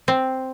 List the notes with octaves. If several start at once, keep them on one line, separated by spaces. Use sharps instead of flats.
C4